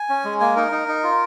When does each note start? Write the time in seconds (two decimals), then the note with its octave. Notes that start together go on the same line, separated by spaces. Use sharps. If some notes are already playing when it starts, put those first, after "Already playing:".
Already playing: G#5
0.09 C#4
0.25 G#3
0.40 A#3 G#5
0.56 D#4 A#4
0.72 D#4
0.88 D#4
1.04 F4